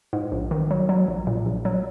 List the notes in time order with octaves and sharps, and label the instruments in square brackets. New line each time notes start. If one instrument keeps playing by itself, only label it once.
[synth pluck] G#2
A#1
D#3
F#3
F#3
A#1
A#2
A#1
F#3